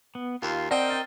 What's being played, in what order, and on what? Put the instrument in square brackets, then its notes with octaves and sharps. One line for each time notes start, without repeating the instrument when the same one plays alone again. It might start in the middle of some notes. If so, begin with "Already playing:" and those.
[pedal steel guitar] B3
[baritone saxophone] D#2 [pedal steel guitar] F4
[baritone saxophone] C4 [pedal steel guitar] A#4 D#5 G5 [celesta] D5 F#5 A5
[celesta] F6 A6